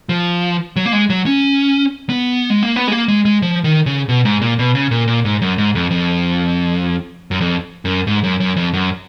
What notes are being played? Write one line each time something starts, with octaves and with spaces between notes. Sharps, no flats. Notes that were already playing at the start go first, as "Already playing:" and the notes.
F3
F#3
A#3
G#3
F#3
C#4
B3
G#3
A#3
B3
G#3
A#3
G#3
G#3
F3
D#3
C#3
B2
G#2
A#2
B2
C#3
A#2
A#2
G#2
F#2
G#2
F2
F2
F#2
F2
F#2
G#2
F#2
F#2
F2
F#2